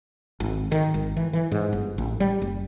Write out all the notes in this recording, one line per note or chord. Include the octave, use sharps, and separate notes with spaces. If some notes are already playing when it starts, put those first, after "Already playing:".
G#1
D#3
G#1
E3
E3
G#2
G1
A1
G3
F#1